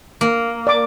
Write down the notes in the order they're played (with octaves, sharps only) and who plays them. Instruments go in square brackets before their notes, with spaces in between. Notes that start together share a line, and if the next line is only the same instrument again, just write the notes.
[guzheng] A#3
[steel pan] D5 D6